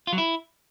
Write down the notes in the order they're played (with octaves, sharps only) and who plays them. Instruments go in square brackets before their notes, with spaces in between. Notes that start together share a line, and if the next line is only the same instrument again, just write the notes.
[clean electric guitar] F4
F#3
E4